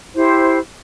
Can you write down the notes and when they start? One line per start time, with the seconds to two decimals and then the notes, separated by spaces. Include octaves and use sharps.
0.15 E4 G4 C5